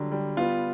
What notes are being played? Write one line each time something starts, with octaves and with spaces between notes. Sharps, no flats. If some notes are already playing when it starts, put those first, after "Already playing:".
Already playing: D3 F#3 G3
G3
B3 F4